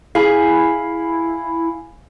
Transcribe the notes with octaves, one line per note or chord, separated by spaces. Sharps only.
E4 G#4 F5 G#5 B5